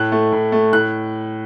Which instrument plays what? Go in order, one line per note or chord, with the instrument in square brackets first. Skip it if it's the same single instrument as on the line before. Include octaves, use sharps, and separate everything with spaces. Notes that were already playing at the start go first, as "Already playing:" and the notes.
Already playing: [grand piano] A2 F#6
A3
A2
A3
A2 F#6